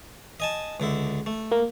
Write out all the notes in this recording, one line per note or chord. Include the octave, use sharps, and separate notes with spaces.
D#5 G#5 A5
C#2 D3 E4
A3
A#3